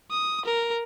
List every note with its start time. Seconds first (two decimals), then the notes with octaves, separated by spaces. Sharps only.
0.11 D#6
0.46 A#4